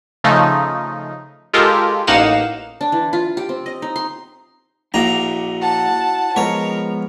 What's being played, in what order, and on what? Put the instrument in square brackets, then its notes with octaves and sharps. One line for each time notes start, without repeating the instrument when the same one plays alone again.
[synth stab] C#3 F3 A3 D#4
G#3 F4 G4 A4 A#4
A1 A#3 D#4 F5 F#5 E7
[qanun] D4
E3
F4
G4
C4
D#5
D#4
C6
[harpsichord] A#1 A#2 A#5 [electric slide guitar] E4 F#4
[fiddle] F#5 A5
[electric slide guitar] F3 G#3 B3 [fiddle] A#4 [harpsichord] C#5